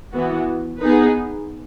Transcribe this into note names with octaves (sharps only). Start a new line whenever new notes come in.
E3 B3 F#4
B3 D#4 G#4 B4